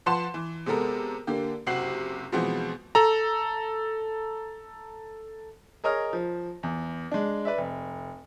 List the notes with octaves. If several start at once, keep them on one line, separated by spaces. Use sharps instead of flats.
F3 B4 F#5 A5 C6 E7
E3
C3 G#3 B3 A4 A#4
D3 A#3 G4
F#1 C3 F#4 G4 C7 F#7
B2 E3 F3 G#3 B3 C4
A4 A#5
G#4 A#4 C#5 D#5 F6
F3
E2
G#3 D4
B4 D5 E5
F1